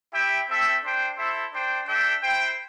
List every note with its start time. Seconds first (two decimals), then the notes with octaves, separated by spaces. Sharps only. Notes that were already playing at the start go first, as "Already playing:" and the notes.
0.13 E4 G4 E5 G5
0.48 C4 A4 E5 G5
0.83 D4 C5 G5
1.18 E4 A4 C5 E5
1.52 D4 C5 G5
1.87 D4 A4 E5 G5
2.23 E4 C5 G5